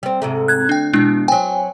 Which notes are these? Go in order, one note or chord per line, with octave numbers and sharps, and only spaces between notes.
G3 C4
G#2 C3 A3
F#6 G#6
D2 D4 G5
E2 B2 G#3 D4 E4
F#3 C4 G5 G#5